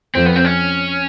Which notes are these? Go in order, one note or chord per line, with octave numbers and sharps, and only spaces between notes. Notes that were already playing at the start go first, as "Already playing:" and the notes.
F2 C4
B3
C4
C#4